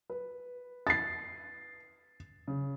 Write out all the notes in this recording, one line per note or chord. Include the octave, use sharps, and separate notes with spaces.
B4
A6 C7
C#3